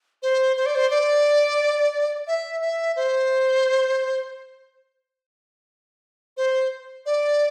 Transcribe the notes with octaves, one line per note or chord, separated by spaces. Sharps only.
C5
C5
D5
C5
D5
E5
E5
C5
C5
D5